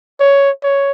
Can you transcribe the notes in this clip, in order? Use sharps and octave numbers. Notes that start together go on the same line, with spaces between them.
C#5
C#5